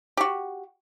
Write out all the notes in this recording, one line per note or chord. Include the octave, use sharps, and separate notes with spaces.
F#4 G4